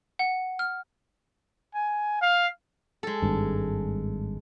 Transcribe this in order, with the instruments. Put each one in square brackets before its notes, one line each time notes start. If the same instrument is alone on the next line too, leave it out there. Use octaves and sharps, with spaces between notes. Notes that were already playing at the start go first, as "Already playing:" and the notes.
[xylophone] F#5
F6
[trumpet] G#5
F5
[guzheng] G#3 A4
[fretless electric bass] G#1 G2